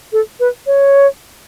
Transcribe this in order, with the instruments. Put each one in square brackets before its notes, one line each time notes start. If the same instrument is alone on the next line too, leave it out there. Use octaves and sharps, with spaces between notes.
[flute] A4
B4
C#5